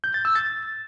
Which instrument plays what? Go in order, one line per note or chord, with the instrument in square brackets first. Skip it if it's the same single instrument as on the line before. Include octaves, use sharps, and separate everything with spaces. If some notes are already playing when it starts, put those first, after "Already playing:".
[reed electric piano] G6
A6
E6
A6